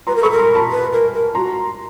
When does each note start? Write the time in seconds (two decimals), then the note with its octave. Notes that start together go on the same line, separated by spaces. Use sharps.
0.07 B4 A#5 C6
0.16 A#4
0.23 A4 B5 C#6
0.31 A#4
0.39 A#5 C6
0.55 A5 B5
0.71 B4
0.92 A#4
1.14 A#4
1.35 F#4 A#5 C6